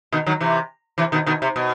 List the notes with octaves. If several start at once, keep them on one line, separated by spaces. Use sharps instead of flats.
B2 D#3
D#3 F#3
C3 E3
C3 E3
B2 D#3
B2 D#3
C3
B2